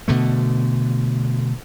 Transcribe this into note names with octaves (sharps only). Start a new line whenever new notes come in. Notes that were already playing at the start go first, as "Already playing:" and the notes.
B2 D3 A3